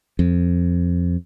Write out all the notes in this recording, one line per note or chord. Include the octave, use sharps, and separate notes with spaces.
F2